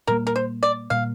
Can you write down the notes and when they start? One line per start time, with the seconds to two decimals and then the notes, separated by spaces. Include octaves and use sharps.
0.07 A#2 G3 A#3 A#4
0.27 A#4
0.36 C5
0.63 D5
0.90 A#2 G3 A#3 F5